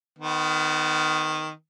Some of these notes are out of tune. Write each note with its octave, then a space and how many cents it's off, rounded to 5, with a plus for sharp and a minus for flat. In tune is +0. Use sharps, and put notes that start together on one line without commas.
D#3 +0 B3 +35